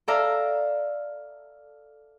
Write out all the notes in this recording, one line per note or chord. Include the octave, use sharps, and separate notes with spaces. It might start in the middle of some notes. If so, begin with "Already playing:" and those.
A4 D5 E5 F5 A#5